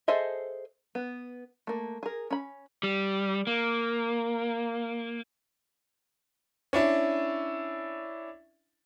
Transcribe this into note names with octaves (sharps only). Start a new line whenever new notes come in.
G#4 A4 C5 D#5 E5
B3
A3 A#3
G#4 A#4
C#4 B5
G3
A#3
C#4 D4 E4